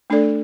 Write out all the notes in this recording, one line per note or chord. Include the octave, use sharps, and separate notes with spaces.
A3 D4 A4 D5